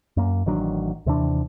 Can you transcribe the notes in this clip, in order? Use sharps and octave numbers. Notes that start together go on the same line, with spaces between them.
F#2 A#3
A1 D#3 F#3 D4
D#2 C3 E3 D4